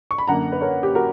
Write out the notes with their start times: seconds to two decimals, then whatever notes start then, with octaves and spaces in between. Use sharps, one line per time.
0.11 C#6
0.18 B5
0.27 F#2 D3 A#3 F#5 A#5
0.52 B4
0.61 A#4 C#5
0.83 G4
0.95 F#4 A#4